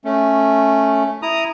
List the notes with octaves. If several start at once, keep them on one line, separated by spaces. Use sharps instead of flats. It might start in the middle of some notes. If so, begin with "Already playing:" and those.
A3 C#4
E4 A#5 D#6